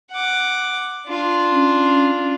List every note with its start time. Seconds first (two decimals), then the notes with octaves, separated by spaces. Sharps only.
0.11 F#5 D6
1.07 D4 F4
1.51 C#4